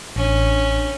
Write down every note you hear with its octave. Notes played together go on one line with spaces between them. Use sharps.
A1 C#4 D4